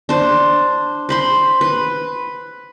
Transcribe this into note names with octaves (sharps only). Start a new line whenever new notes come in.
D4 C5
C5 B5 C6
B4